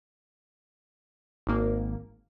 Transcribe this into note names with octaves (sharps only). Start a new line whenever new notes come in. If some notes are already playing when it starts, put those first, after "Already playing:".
G#1 A#3